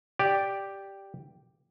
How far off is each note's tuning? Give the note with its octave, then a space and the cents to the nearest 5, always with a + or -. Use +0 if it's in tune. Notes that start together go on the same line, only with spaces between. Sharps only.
G4 +0 D5 +0